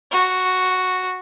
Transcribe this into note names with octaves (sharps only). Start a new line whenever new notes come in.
F#4